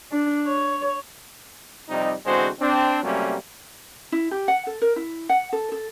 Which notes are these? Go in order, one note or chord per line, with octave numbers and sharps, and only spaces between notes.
D4
C#5
F2 C3 G3 D#4
E2 D3 G#3 C4 F#4 C5
C4 D4
C3 F#3 G3 A3 A#3 C#4
E4
G4
F#5
A4
A#4
E4
F#5
A4
A4